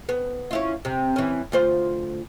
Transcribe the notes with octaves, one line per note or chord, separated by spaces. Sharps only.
B3
C#4 E4 F4
C3
E3 C#4
D2 F4 C5